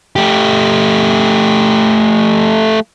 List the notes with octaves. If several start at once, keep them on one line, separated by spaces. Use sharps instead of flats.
A3 G4